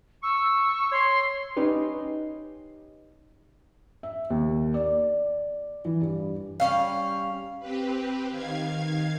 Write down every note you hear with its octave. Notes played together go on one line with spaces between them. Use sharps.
C#6 E6
C#5 C6
C#4 D#4 G4 B4
E5
D#2
D5
E3
G2
G3 B3 C#4 F5
C4 G4 B4
D#3 F5 G#6